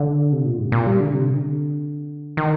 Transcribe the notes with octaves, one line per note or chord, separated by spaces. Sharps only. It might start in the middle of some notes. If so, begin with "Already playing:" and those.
Already playing: D3
C3
A#2
G#2
C3
A#2
G3
D3
C3
D3
D#3